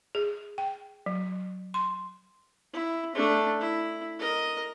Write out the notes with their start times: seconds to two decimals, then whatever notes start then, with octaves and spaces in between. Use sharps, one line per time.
0.15 G#4
0.58 G5
1.06 F#3
1.74 C6
2.73 E4
3.15 A3 D4
3.61 E4
4.19 A#4 D#5